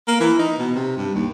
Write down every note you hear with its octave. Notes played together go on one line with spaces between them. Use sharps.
A#3
E3
D#4
B2
C3
G2
D#2